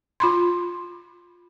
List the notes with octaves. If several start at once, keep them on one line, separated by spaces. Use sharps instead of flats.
F4 B5 C6